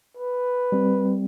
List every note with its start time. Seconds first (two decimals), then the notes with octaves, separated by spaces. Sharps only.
0.17 B4
0.72 G3 C4